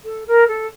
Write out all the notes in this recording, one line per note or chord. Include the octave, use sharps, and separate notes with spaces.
A4
A#4
A4